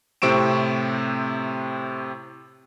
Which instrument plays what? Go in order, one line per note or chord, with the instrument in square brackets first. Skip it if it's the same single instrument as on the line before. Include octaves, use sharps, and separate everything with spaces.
[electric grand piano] A2 C3 C4 C#6 D7 E7